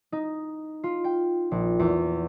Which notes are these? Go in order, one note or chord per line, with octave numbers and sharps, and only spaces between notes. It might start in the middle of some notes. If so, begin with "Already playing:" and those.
D#4
F4
G5
A#1
E2